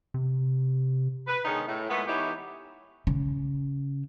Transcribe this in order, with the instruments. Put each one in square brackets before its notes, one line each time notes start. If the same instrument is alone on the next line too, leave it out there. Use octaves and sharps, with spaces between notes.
[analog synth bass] C3
[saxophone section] B4
D3 D#3 G#3 B3 C#4 D#4
A2
A#2 G#3 A3 B3
E3 B3 D#4 E4 G4 C#5
[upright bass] C#3